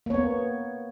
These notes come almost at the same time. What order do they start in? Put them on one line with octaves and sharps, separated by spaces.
A#3 C#5 B3